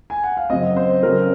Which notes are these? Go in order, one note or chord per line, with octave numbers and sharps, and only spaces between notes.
G#5
F#5
F5
F#2 C#3 F#3 C4 D#5
C5
C#3 F#3 C4 A#4